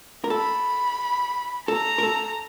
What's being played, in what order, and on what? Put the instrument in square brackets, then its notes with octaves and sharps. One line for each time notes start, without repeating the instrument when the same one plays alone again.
[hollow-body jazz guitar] A#4
[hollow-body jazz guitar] A4 [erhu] B5
[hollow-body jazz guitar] A4 [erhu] A#5
[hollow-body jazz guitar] A#4
A4